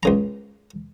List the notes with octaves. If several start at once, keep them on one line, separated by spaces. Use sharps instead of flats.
C#2 C#3 A#5